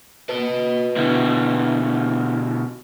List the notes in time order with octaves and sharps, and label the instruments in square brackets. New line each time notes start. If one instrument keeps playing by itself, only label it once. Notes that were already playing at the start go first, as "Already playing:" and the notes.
[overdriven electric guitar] B4 D#5
[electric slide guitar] B2 D3 E4